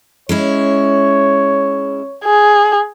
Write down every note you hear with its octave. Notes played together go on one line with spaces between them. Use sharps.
G#3 C#4 E4 C#5
G#4